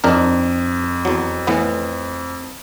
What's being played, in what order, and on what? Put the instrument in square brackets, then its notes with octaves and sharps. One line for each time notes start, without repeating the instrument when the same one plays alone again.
[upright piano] F2 [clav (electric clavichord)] D4 D#4 A#4
[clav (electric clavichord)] E2 F#3
A2 E3 B3